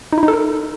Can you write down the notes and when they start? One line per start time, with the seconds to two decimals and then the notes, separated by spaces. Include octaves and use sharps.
0.12 D#4
0.18 E4
0.23 D#4
0.28 A4
0.33 A#4